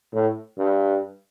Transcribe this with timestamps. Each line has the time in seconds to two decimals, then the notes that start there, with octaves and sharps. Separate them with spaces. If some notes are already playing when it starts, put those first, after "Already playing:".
0.13 A2
0.58 G2